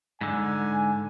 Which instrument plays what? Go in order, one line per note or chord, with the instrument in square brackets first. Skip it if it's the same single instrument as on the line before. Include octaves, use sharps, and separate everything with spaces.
[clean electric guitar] G#2 D3 [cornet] G#5